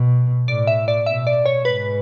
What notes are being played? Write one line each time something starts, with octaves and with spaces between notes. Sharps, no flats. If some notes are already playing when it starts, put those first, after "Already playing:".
Already playing: B2
A2 D5
E5
D5
B2 E5
D5
C#5
G#2 B4